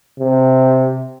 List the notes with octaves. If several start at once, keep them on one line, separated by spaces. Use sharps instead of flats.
C3